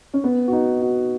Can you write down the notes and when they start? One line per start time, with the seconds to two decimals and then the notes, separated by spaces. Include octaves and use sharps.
0.14 C#4
0.24 B3
0.48 F#4
0.52 D#4
0.82 F#4